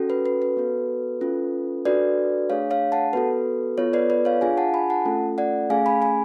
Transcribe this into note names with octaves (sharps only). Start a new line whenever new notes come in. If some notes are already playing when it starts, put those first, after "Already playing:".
Already playing: C#4 F#4 A4
B4
B4
B4
B3 F#4 A4
C#4 F4 A4
D4 F#4 A4 B4 D5
A3 D4 G#4 C#5 F5
C#5 F5
F#5 A5
B3 F#4 A4 B4
B3 F4 A4 C#5
B4 D5
B4 D5
C#5 F5
D4 F4 G#4 F5 G#5
F#5 A5
G#5 B5
F#5 A5
A3 C#4 F4 A4
D5 F#5
A3 C#4 G#4 F5 G#5
G#5 B5
G#5 B5